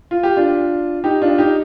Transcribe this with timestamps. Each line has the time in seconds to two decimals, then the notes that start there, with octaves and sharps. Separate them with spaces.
0.11 F4
0.23 G4
0.37 D4 F4
1.04 D#4 G4
1.22 D4 F4
1.38 D#4 G4